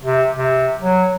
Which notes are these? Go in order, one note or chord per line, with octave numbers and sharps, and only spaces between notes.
C3
C3
F#3